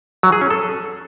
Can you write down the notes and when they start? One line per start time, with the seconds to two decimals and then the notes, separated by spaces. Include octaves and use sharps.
0.23 F#3
0.32 G#4
0.41 C#4
0.50 A4